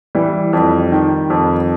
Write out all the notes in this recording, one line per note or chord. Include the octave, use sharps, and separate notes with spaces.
E3 G3
F2
D#3
F2